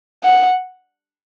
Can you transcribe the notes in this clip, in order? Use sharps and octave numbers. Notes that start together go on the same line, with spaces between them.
F#5